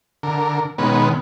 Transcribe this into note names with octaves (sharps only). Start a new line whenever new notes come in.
D3 A#4
B2 D#3 G#3 B3 C#4 B4